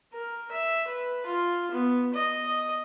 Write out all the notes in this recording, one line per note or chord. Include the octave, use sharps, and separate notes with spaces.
A#4
E5
B4
F4
B3
D#5
D#5